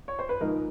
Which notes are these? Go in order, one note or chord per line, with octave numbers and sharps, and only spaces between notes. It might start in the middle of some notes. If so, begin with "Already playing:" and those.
C#5
C5
B4
G#2 F3 A#3 D#4 A#4